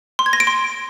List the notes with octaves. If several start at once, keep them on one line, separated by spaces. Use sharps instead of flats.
C6
G#6
A#6
D7
C6